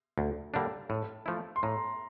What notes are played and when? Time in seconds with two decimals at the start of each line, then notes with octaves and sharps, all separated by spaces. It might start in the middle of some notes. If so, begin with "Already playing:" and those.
0.18 D2
0.54 D3 G3 A#3 D4
0.89 A2 A5
1.26 F3 A3 E4
1.56 C6
1.63 A2 A#5